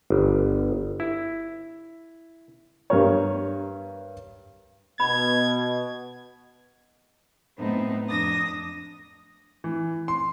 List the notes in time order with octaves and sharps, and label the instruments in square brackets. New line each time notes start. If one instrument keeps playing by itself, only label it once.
[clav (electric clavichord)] G1
E4
[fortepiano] G2 A#4 C#5
[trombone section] B2 [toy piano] B5 [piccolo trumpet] G#6
[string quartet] A2 F#3 B3 C4 D#4
F2 D4 D#6 A#6
[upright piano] E3
C6